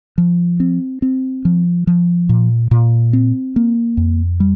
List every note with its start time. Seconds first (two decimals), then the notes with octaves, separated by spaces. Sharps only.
0.18 F3
0.60 C4
1.02 C4
1.45 F3
1.87 F3
2.29 A#2
2.71 A#2
3.13 C4
3.56 A#3
3.97 F2
4.40 G3